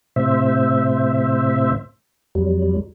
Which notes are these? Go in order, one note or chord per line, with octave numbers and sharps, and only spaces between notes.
A2 C3 C5 E5
F2 F#3 G3